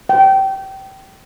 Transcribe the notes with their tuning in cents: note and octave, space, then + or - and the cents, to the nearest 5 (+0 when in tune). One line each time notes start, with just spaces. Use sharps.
G5 -20